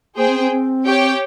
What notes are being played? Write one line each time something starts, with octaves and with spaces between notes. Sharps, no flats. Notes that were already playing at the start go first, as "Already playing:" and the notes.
A#3 G#4 C5 G5
C4
C4
C4
G4 C#5 G5